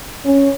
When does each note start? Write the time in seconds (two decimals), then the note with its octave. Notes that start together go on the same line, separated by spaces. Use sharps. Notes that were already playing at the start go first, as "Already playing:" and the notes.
0.24 C#4